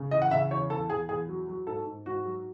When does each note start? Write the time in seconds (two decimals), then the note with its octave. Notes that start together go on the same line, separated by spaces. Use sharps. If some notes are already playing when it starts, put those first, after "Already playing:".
Already playing: C#3
0.11 E3 D#5
0.22 F#5
0.31 C#3 E5
0.51 E2 C#5
0.70 E2 A4
0.90 E2 G#4
1.09 E2 G#4
1.29 F#3
1.48 F#3
1.67 G#2 A4
1.87 G#2
2.06 G#2 F#4
2.25 F#3